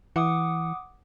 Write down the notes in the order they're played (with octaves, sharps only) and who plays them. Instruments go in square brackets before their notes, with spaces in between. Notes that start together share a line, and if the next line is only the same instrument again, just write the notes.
[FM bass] E3 [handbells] F#5 D6 D#6